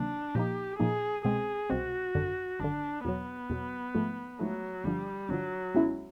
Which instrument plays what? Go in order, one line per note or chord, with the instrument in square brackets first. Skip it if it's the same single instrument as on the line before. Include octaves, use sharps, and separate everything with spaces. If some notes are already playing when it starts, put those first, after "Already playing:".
Already playing: [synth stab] C#2 C3 D#3 F#3 A#3 [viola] D4
[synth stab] A#2 F3 A#3 D#4 [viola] G4
[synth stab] A#2 F3 A#3 D#4 [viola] G#4
[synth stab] C2 B2 G#3 C4 [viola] G#4
[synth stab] C2 B2 G#3 C4 [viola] F#4
[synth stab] G#1 F#2 D3
[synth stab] G#1 F#2 D3 [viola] D4
[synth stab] E2 B2 F#3 [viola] B3
[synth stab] E2 B2 F#3
G#2 F3 A3
[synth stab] G#2 F3 A3 [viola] F#3
[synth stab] G1 G2 D3 F3 [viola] G3
[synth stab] G1 G2 D3 F3 [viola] F#3
[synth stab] C#2 B2 G#3 C#4 E4